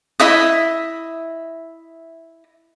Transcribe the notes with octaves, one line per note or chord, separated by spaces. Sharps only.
E4 D#5 E5 D#6